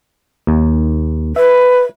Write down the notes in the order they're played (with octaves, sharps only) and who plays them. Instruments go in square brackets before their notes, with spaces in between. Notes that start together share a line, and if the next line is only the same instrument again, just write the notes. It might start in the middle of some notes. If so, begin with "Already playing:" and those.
[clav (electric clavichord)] D#2
[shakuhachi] B4 [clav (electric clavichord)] E5